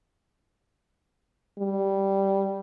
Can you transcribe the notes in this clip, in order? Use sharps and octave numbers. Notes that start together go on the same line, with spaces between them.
G3